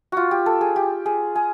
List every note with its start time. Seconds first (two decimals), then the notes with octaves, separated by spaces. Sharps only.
0.12 F4 F#4
0.31 G4
0.46 A4
0.61 G#4
0.76 G4
1.06 G#4
1.35 G#4